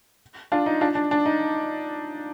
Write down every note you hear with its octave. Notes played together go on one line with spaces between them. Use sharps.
D4 F4
D#4
D4 F4
D4
D4
D#4